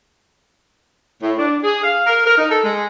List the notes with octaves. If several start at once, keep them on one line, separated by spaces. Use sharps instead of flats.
A2
D4
G#4
F5
A#4
A#4
D#4
A4
G#3